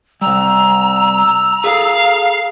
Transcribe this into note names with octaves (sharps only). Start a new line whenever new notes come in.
C3 G3 A#5 E6
G#4 A4 F5